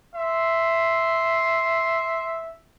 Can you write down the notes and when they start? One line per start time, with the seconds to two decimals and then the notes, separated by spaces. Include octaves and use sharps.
0.14 E5 C6